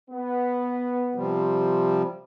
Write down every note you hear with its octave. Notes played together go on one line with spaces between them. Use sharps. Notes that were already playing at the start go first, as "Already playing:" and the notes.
B3
C3 F3 G3